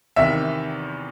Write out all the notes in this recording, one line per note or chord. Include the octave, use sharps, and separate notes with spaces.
E2 C3 D#3 E5